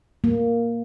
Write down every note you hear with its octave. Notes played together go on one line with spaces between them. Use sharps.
A#3